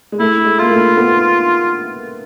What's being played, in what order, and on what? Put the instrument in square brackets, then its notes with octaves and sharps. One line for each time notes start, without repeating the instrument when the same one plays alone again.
[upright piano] G#3
[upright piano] A3 [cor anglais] E4
[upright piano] G#3
[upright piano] A#3 [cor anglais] F4
[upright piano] A3
B3